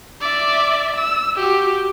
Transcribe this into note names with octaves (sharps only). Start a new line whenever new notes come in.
D5 E5
E6
F#4 G4